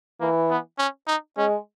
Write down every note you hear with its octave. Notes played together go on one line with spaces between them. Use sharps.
E3 A#3
B3
C#4
D#4
G#3 C#4